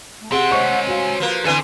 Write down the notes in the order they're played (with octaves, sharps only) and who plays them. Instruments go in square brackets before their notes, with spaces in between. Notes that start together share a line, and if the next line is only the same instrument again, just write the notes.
[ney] A3
[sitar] C3 [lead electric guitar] C4 [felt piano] G#4 [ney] F#5
[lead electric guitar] G#3 C#5 [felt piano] C5 D#5 C#6
[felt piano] F#4 F5 [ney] G#5
[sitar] F3 A#3 [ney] B4
[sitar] D3 E3 C4 [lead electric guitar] A4 G#5